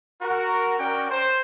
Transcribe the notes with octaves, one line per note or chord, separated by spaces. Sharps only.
F#4 A#4
C#4 F#4 A#4 D5 G5
C5